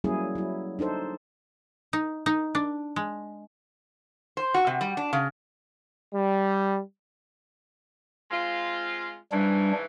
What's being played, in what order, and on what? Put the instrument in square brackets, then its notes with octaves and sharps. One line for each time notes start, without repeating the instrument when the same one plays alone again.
[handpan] F#3 G3 A#3 C#4 E4 G#4
F#3 E4
D4 D#4 A4 C5
[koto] D#4
D#4
D4
G#3
[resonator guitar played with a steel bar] C5
F#4
C3
G3
D4
C#3
[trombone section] G3
[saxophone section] G#3 C4 F4
[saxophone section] G#2 C#3 E3 [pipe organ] G3 D4